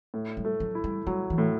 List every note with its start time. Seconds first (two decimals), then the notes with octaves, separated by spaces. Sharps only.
0.14 A2
0.37 G3
0.45 A3
0.60 F#3
0.75 E4
0.84 G3
1.07 F#3 G3
1.30 E3
1.38 A2